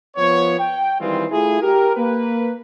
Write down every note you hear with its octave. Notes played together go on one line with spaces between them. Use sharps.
F3 B3 C#5
G5
D#3 E3 G3 G#3 C4 F4
A3 E4 F4 G#4
G4 A#4
A#3 B4